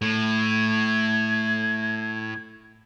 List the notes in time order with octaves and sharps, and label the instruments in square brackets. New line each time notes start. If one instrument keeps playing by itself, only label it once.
[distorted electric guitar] A2 [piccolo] G#6